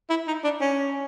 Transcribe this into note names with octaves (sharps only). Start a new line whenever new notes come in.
E4
D#4
D4
C#4